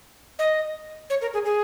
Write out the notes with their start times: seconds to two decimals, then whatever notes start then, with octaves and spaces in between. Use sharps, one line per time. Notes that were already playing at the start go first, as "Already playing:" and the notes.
0.39 D#5
1.10 C#5
1.22 A#4
1.34 G#4
1.46 G#4